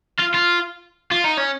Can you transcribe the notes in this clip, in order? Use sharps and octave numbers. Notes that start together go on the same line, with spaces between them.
F4
F4
F4
D#4
C#4